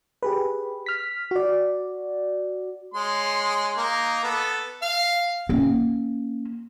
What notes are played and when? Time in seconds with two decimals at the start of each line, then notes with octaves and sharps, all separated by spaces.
0.23 G4 G#4 B4
0.86 F6 B6
1.31 F#4 D5
2.94 G#3 C#5 C6
3.77 A#3 D#4 A#4
4.23 B3 A4
4.82 F5
5.49 A#3 C#4